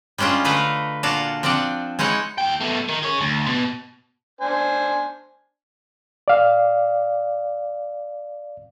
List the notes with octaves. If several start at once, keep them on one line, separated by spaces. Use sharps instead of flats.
G3 G#3 C#4 D4 F4
D3 A3 B4 D#5 F5 A#5
A#2 D4 F4 F#4 F5 A5
F3 C4 D4 D5 F#5
G#3 D#4 E4 C#5 F#5
D#2 G5
B2 A3
D#3
G#4 C#5
D2
B2
D4 C5 G#5
D5 F5